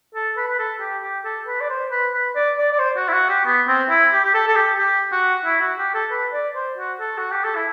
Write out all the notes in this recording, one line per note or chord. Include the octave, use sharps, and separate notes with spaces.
A4
B4
B4
A4
G4
G4
A4
B4
D5
C5
B4
B4
D5
D5
D5
C5
F#4
E4
F#4
G4
B3
C4
E4
G4
G4
A4
A4
G4
G4
F#4
E4
F#4
G4
A4
B4
D5
C5
F#4
A4
F#4
G4
A4
E4